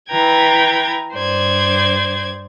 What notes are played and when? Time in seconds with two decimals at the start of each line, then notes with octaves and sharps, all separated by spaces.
0.10 E3 B4 G5 A#5 G#6
1.15 G2 C5 D5 G#6